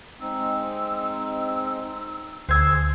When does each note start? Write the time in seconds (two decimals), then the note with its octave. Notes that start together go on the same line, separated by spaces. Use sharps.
0.21 G#3 C4 D#4 E6
2.49 D2 G#4 C5 E6 G#6